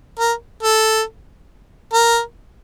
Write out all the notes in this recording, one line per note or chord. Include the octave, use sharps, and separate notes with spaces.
A#4
A4
A#4